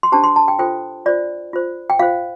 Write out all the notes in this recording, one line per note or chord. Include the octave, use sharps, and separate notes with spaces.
C6
D4 G4 C5 A5
C6
A5
G5
F4 A4 C5 G5
F4 C5 D5
F4 C5
G5
F4 C5 F5